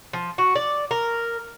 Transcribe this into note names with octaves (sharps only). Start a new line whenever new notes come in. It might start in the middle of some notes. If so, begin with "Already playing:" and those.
F3
F#4
D5
A#4